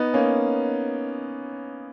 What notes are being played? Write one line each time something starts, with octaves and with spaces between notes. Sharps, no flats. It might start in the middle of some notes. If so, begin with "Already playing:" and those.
Already playing: B3 D#4
A#3 C#4